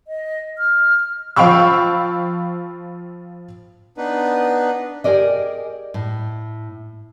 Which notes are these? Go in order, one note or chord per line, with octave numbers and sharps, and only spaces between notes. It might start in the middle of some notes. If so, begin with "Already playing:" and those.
D#5
F6
F3 F5 G5 B5 C#6 E6
B3 D4 D#4 B4
G4 G#4 A#4 D5 D#5
A2